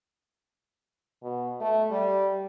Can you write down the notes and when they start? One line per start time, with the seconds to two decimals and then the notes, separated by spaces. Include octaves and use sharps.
1.23 B2
1.61 A3
1.91 G3